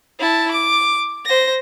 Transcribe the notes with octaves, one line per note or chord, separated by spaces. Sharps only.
E4 A5
D6
C5 A#6